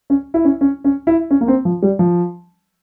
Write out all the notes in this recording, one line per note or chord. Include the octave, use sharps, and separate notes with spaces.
C#4
E4
C#4
C#4
C#4
E4
C#4
A#3
C4
F3
G3
F3